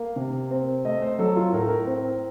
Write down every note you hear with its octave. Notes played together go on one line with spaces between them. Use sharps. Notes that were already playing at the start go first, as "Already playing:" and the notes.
Already playing: A#3 F5
C3
C4
A3 D#5
C5
F#3 A4
F4
A2 A#4
A4
A#4
C4